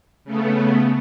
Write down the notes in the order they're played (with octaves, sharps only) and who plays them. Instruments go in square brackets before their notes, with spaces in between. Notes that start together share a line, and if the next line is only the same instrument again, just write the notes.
[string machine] C#3 A3 B3